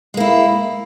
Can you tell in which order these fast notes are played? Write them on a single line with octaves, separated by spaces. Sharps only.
G#3 A#3 E4